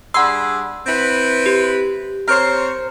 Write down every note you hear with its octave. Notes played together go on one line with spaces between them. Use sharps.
G3 D4 G#4 F#5 C6 E6
C4 E4 B4
G4
C4 A#4 C5 C#5